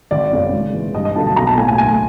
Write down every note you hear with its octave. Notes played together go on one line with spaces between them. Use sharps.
G#1 D5
F#2 C#3 F#3
G#2
E3 G#3
G2 D#5
D#5
D3 F#3 A#3 A5
A5
B1 A#5
A5
A2 F#3 A#3 G#5
G#5
D2 G#5